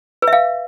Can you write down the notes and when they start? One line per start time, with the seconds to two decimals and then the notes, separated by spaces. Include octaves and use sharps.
0.22 B4
0.28 E5
0.33 F5